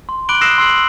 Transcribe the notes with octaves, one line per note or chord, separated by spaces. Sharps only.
C6
B5 D6 F#6 D7 F#7 G7
D#6 E6 F#6 A#6 C7 E7
C6 E6 C7 F#7